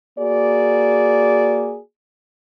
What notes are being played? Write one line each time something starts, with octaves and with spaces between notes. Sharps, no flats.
A#3 F#4 G#4 D5